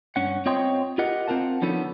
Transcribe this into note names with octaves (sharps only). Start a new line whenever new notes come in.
G2 C#4 F#5
C4 F4 C#5 D#5 G5 C6
F4 G4 A#4 D#5 F#5
C4 F4 A#4 F#5 A5
D3 F3 B3 C#4 D#4 A4